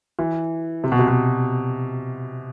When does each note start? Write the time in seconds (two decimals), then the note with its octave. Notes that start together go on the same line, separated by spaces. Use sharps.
0.19 E3
0.84 C3
0.92 B2
0.99 C3
1.08 B2